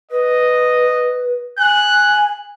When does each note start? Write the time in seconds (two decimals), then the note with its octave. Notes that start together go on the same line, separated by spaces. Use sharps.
0.11 B4 D#5
1.59 G#5 F#6